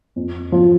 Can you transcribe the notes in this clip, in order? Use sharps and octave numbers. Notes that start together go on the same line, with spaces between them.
F2
F3